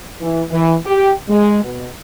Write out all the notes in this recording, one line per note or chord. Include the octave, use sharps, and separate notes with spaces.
E3
E3
G4
G#3
B2